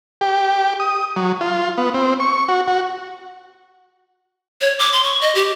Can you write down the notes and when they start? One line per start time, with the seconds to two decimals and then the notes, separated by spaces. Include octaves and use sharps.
0.21 G4
0.80 D#6
1.16 F#3
1.41 F4
1.78 B3
1.94 C4
2.20 C#6
2.49 F#4
2.68 F#4
4.61 C#5
4.79 D6
4.93 C6
5.04 C#6
5.21 D#5
5.35 G4